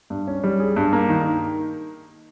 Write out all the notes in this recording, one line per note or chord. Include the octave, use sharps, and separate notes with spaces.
G2
C#4
G3
G#4
G2
A#3
D#3